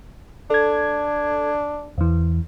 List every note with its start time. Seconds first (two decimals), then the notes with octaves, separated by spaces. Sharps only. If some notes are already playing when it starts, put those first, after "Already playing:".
0.50 D4 A4 G#6
1.98 E2 E3